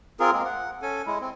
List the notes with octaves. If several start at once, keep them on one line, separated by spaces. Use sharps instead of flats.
C4 F4 G#4 A#4
G#3 A#3 C4
F#5
C#4 A4 G#5
G#3 E4
C4